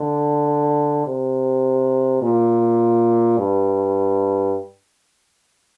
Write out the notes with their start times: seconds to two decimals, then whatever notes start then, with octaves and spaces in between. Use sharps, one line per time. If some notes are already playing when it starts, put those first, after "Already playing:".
Already playing: D3
1.07 C3
2.22 A#2
3.38 G2